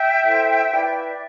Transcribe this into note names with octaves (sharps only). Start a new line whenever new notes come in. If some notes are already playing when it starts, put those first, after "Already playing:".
Already playing: E5 G5
E4 A4 C5
E4 B4 D5 F5
E5 G5
E5
D5